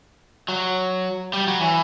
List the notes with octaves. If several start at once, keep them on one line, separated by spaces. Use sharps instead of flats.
F#3
G3
F#3
E3